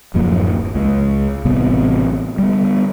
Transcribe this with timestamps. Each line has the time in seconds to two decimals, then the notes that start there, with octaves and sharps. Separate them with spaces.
0.14 D1 F#2 F3 A#3
0.74 C#2 G#3
1.45 A1 C3 G3 B3
2.38 G3 B3